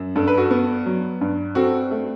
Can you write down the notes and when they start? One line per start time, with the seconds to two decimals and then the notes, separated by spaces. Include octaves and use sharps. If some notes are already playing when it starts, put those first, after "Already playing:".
Already playing: F#2
0.16 G2 A4
0.27 B4
0.38 F#4 A4
0.51 B3
0.86 F#3
1.21 G2
1.55 C4 F#4 A4
1.91 A3